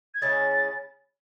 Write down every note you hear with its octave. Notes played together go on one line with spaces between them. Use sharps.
G#6
C#3 G#3 C#4 E4 A6